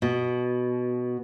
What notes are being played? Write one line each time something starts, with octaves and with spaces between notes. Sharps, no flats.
B2